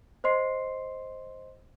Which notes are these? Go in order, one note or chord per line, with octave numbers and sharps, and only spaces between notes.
C5 D#5 C6 C7